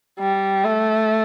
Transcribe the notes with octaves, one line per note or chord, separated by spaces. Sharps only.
G3
A3